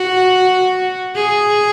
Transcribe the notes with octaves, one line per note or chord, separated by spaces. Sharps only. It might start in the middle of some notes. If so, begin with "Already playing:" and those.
Already playing: F#4
G#4